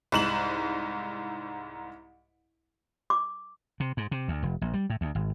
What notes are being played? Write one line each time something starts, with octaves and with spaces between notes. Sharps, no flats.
C2 G#2 E7 F#7
D6
C3
G#2
C3
D2
F1
A#1
G3
A2
D2
G#1